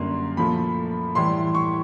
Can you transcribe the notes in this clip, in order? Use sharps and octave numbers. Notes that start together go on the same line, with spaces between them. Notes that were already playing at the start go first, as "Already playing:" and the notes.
Already playing: F#2 D3 G3 A#3 C6
A#2 F3 A3 B5
A2 E3 G3 C6
C#6